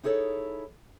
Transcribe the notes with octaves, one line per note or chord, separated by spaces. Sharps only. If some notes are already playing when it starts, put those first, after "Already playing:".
D#4 E4 G#4 A4 C#5